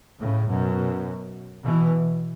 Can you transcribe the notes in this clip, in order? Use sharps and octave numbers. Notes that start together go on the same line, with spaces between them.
A2 C#3
F#2 B2
B2 E3